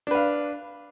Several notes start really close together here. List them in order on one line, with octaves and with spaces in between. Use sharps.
D4 B4 F5